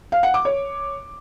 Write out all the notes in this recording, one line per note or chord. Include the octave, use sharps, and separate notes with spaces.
F5
F#5
D6
C#5